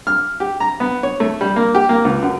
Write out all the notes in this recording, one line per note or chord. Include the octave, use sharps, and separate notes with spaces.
F6
G4
A#5
B3
C#5
A3
G3
A#3
G4
A#3
C#2
F#2